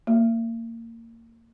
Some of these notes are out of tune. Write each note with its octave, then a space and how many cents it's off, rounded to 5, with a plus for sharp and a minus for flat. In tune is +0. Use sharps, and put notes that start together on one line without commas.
A#3 -25